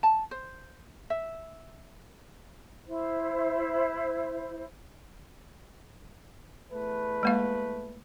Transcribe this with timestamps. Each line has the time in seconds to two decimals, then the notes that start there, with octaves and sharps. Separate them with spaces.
0.03 A5
0.31 C5
1.10 E5
2.88 E4 C5
6.72 E2 A3 B4
7.23 G#3 A#3 F5